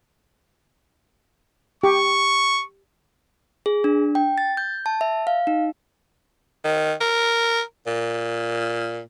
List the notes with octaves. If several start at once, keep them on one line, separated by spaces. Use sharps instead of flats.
G4 C#6
G#4
D4
G5
A6
G6
A5
E5
F5
D#4
D#3
A#4
A#2